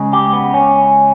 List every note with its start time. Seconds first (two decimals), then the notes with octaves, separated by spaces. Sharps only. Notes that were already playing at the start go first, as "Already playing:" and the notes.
Already playing: C#3 G#3
0.13 G4
0.33 B3
0.54 C#4